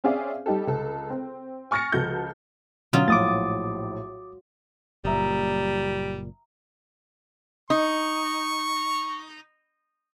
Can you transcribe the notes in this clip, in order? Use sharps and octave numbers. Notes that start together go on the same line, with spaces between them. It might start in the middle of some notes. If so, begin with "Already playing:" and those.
C4 C#4 G#4 D5 E5 F5
G3 D#4 G4 A4
C#2 A4
C4
G#5 C#6 F6 A6 A#6 C#7
C#2 F3 F#4 A4 A5 G6
B2 D3 F#3 C#4 F4 D#6
A#1 A2 D6 D#6 A6
F#1 A#2 G3 E5 A#5 D#6
D#4 C#6